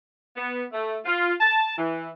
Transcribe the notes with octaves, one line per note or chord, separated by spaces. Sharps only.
B3
A3
F4
A5
E3